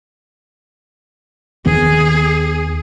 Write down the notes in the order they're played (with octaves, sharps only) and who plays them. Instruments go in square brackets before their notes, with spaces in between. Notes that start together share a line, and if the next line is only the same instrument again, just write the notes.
[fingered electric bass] D#2 D#3 B3 [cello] G#4